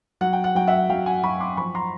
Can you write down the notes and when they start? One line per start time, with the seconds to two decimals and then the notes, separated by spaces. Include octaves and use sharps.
0.21 F#3 F#5
0.33 G5
0.44 F#5
0.55 F#3 G5
0.67 E5 F#5
0.90 F#3 F5 G5
1.06 F#5 G#5
1.23 F#3 B5 C#6
1.40 C6 D6
1.57 F3 B5 C#6
1.75 A#5 C6